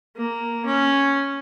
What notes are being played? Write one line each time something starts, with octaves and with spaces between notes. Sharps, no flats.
A#3
C#4